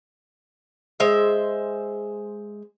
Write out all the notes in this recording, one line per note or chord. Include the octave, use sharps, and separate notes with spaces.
G#3 C5 E5